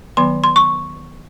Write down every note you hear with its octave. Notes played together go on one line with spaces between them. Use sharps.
D#3 F#3 B3 C6
C6
C#6